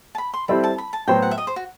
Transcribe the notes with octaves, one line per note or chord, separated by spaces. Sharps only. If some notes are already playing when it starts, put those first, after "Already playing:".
A5
B5
C6
G3 C4 E4 A4 C5 B5
A5
B5
A5
A2 F#3 B3 F#4 C5 G5
F#5
E5
D#5
C5
F#4